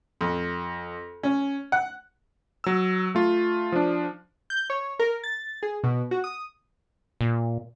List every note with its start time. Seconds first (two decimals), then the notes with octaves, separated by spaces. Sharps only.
0.21 F2
1.23 C#4
1.72 F#5
2.64 F#3 E6
3.15 A3 F4
3.72 F3 D4
4.50 G6
4.70 C#5
4.99 A#4
5.24 A6
5.63 G#4
5.84 B2
6.11 F#4
6.24 D#6
7.21 A#2